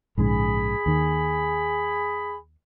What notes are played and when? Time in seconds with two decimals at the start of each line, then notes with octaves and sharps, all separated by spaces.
0.18 A#1 G#2 C#3 G#4 B5
0.86 D#2 D#3